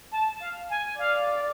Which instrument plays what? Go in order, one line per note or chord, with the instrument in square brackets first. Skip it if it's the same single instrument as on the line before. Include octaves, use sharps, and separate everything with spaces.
[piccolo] A5
F5
G#5
[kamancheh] D5 [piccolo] F5